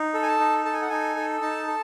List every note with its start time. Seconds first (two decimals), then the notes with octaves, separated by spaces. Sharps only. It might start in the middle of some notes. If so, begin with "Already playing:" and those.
Already playing: D#4
0.14 A4
0.23 G#5
0.27 A5
0.40 D#4
0.65 A4 A5
0.73 G#5
0.82 F#5
0.89 D#4 G#5
1.17 A4
1.41 D#4 A5
1.67 A4